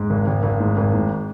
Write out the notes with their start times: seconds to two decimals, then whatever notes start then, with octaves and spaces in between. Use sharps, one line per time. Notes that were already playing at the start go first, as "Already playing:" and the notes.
Already playing: G#2
0.10 G#1
0.27 G#1
0.43 G#1
0.60 G#2
0.77 G#1
0.94 G#2